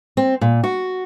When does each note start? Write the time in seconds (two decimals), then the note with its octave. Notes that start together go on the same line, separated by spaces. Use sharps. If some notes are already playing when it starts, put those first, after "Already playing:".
0.17 C4
0.41 A#2
0.64 F#4